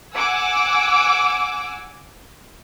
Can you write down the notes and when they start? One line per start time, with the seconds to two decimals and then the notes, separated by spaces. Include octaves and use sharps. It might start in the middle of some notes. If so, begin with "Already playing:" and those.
0.14 F#5 G#5 D6 E6